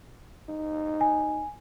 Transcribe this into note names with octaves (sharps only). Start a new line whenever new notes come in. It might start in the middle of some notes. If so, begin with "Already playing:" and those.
D#4
G#5